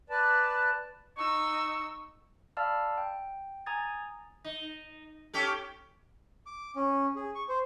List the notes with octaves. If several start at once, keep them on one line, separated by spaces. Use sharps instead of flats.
B4 D5 A5
D#4 C#6 E6
D5 F5 A5 B5 E6 F6
G5
G#5 A#5 D#6 G#6 A6
D#4
C#4 G4 A4
D6
C#4
G#4
C#6
C5